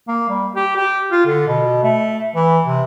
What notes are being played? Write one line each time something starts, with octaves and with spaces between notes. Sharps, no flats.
A#3
G3
G4
G4
F4
D3
B2
A3
E3
C3